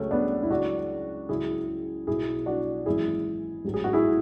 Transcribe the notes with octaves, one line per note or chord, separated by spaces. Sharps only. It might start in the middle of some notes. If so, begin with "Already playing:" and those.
Already playing: C#2 C#3 F#3 A3 C#4
B3 D4
E4
C#2 C#3 F#3 D4 F#4
C#2 C#3 F#3 E4 G#4
B1 B2 F#3 E4 G#4
D4 F#4
G#1 F#2 E3 E4 G#4
A1 G#2 F#3
G#4
F#4
E4 G#4